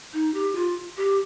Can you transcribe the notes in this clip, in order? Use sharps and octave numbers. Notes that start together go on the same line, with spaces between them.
D#4
G4
F4
G4